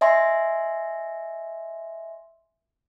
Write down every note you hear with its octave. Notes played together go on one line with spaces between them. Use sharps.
D#5 E5 G#5 C6